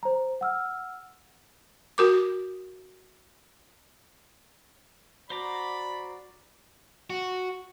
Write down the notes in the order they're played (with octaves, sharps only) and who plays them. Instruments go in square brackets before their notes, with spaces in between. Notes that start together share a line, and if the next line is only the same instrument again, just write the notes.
[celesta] C5 A#5
F#5 E6 F6
[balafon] F#4 A#4 D6
[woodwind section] F#4 D5 [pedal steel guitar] C5 A#5 D6 [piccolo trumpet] B5
[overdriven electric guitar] F#4